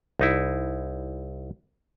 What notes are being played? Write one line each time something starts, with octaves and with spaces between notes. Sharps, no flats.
C2 D#4 E4